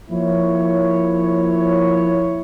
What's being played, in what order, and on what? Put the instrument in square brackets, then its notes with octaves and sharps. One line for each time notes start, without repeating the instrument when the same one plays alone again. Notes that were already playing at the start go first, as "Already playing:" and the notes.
[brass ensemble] F3 A#3 E4 C#5